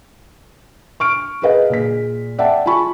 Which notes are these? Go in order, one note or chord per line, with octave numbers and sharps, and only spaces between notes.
C#6 F6 D7
G#4 A#4 B4 D#5 F5
A#2 G#4 B6
D5 E5 F#5 G5 A5
F4 G#5 A5 B5 C#6